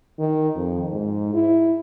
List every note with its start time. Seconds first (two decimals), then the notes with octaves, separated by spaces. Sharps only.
0.19 D#3
0.55 F2
0.91 G#2
1.34 E4